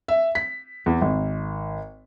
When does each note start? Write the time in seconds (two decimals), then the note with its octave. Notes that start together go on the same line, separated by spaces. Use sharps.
0.08 E5
0.35 B6
0.86 E2
1.01 G#1